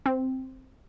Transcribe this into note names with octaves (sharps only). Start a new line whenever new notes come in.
C4